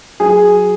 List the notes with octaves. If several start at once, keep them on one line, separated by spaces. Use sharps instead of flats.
F#3 G#4